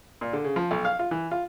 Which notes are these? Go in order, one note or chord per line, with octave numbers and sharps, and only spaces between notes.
A#2
D3
C#3
F3
B1
F5
F4
E3
F4